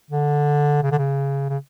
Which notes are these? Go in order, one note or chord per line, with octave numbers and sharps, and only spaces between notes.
D3
C#3
D3
C#3
C#3